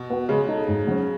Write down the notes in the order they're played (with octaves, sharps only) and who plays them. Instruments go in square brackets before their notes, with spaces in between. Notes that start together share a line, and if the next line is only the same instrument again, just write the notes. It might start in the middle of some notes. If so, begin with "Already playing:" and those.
Already playing: [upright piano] B2
[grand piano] B3 F#4
[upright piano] C#3 [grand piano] G#3
[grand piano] D#4 A4
G#2
F#3 C#4